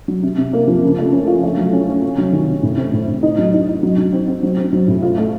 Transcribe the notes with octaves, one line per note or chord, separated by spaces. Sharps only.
F#3
C3
C3
A#3
F3
C#3
A3
C#4
F4
A3
F#3
C#4
C#4
C3
F#3
D#3
C3
A2
C4
A2
A2
D#4
F#3
D#4
D#4
F#3
F#3
C4
C4
F#3
C4
F#3
A2
F4
A3